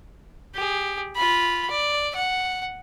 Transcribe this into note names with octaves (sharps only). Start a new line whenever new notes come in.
G4 G#4
F4 B5
D5
F#5